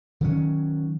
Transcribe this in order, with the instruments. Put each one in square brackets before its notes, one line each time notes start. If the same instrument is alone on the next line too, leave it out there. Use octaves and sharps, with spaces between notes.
[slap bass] D#3 F#3 C#4